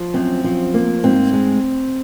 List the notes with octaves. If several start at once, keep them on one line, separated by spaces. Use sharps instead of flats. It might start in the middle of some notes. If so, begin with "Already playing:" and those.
Already playing: F3
F#2 C4
F3
A#3
G#2 C4
G#3